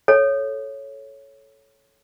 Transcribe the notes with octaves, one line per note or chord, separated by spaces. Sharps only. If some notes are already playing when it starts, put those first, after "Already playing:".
A4 C#5